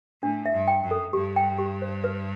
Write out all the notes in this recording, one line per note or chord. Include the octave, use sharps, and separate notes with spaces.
A2 D4
E5
G2
G5
F#2
A4
G2 G4
G5
G4
C5
B4